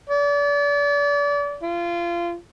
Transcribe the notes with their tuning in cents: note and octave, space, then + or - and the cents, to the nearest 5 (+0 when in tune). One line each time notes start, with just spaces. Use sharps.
D5 -35
F4 -25